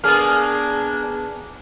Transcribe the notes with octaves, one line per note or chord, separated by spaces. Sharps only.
A#3 B3 D4 G#4 F6